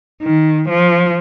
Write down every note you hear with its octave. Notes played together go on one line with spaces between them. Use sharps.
D#3
F3